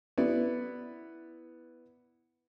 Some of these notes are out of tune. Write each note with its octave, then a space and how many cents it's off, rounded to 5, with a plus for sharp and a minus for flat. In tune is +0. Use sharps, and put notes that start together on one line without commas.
B3 +0 E4 +0 D5 +0